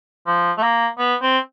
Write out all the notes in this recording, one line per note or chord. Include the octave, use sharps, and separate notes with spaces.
F3
A3
A#3
B3
C4